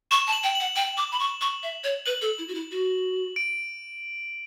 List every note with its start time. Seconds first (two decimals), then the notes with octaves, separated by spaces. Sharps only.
0.11 C#6 E7
0.27 A5
0.32 F#7
0.44 G5
0.55 F#7
0.60 F#5
0.76 G5 F#7
0.97 D6
1.12 B5
1.20 C#6
1.41 C#6
1.63 E5
1.84 C#5
2.06 B4 F#7
2.22 A4
2.38 E4
2.48 F#4
2.55 E4
2.71 F#4
3.36 D7